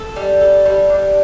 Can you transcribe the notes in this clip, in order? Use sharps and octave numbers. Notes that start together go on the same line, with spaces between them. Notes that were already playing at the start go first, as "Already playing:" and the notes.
Already playing: A4
G3
A4
G3
D4